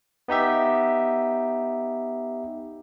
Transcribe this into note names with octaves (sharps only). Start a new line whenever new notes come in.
B3 D#4 G4 E5